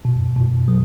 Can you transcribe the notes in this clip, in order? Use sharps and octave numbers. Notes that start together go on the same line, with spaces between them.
B2
B2
F#3